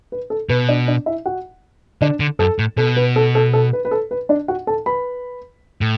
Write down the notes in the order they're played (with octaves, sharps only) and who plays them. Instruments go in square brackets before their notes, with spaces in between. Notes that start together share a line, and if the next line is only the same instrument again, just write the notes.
[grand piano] B4
A4
[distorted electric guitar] B2 [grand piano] B4
[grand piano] D4 D5
D4 D5
E4 E5
F#4 F#5
[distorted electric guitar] D3 [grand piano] D4 D5
[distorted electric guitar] D3
[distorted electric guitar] F#2 [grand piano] A4
[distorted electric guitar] A2
[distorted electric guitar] B2 [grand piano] A4
[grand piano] B4
A4
A4
A4
B4
B4
A4
B4
D4 D5
F#4 F#5
A4 A5
B4 B5
[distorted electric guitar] A2